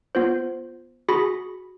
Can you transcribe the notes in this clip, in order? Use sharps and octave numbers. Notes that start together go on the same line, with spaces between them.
B3 F4 C5
F#4 G#4 B5 A#6